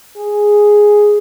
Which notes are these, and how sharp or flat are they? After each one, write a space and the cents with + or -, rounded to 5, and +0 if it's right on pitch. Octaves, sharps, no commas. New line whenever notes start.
G#4 +0